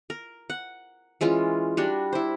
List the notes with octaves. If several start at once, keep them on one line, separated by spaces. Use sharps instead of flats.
A#4
F#5
E3 G#3 C#4 F4
G3 D4 F#4
E4 C5